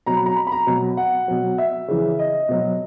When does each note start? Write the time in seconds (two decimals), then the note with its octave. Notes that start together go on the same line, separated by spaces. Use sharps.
0.06 B2 F#3 A#5
0.16 B5
0.26 A#5
0.36 B5
0.47 B5
0.52 A#5
0.67 B2 F#3
0.97 F#5
1.28 B2 F#3
1.58 E5
1.88 C#3 E3
2.19 D#5
2.49 B2 F#3